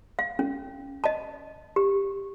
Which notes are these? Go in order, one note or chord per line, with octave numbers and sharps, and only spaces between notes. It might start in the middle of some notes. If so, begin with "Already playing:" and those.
F5
C#4
D#5 A5
G4